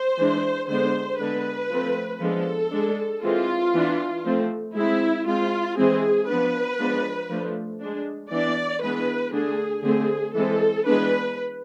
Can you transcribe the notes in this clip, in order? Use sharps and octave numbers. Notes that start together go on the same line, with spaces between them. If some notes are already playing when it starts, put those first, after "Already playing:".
Already playing: C5
E3 G#3 D4
D3 G#3 B3 D4 C5
D3 G#3 B3 D4 B4
F3 A3 C4
F3 G#3 B3 D4 A4
G#3 D4
E3 G#3 C4 F4
E3 B3 D4
F3 A3 C4
G#3 C4 E4
G#3 C4 F4
E3 G#3 C4 G#4
F3 B3 D4 B4
F3 G#3 B3 D4
F3 A3 D4
G#3 D4
E3 B3 D4 D5
E3 G#3 B3 D4 B4
D3 A3 D4 G#4
D3 A3 C4 G#4
E3 G#3 C4 A4
E3 G#3 B3 D4 B4